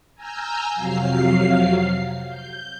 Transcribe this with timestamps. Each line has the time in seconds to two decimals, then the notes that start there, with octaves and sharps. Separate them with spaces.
0.15 G#5 A#5 E6 F6 G6
0.75 F2 C3 F#3 F5 C7
2.28 G6